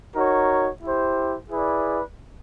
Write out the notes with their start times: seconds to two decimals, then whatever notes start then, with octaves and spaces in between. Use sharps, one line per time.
0.16 D#4 F#4 A#4 C#5
0.82 E4 G4 C5
1.48 E4 G#4 B4 D5